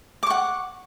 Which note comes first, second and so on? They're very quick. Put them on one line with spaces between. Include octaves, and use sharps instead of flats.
D6 C#6 F#5